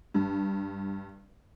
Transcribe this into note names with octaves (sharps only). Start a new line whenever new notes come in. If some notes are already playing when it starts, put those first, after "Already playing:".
G2